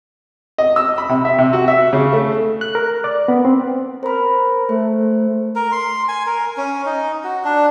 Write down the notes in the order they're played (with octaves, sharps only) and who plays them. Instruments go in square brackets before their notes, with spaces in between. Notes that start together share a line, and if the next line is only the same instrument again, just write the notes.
[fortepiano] D#5
E6
B5
C3
E5
C3
F#4
E5
C#3
A3
[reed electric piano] F#6
A#4
D5
B3
C4
[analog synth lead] A#4 [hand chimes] C5 B5
[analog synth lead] A3 [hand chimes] C5
[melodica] A#4
C6
G#5
A#4
C#4
D#4
F#4
D4